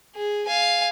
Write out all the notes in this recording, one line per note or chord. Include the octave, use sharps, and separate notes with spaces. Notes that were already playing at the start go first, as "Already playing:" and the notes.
G#4
F5 G#5